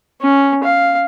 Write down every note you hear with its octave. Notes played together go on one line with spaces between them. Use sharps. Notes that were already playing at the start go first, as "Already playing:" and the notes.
C#4
F5